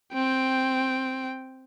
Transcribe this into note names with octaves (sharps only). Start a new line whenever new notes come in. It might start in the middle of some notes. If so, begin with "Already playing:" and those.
C4 G5